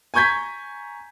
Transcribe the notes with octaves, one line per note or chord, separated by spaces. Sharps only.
G#5 A#5 C#6 G6 G#6 B6